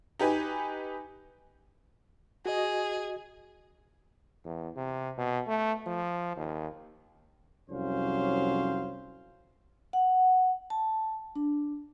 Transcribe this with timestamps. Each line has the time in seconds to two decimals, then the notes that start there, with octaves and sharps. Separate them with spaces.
0.19 D#4 G4 B4 G#5
2.46 F#4 G#4 D#5
4.45 E2
4.76 C3
5.18 B2
5.47 A3
5.86 F3
6.36 D#2
7.69 C2 F2 F#3 C#4 C5 F5
9.93 F#5
10.70 A5
11.36 D4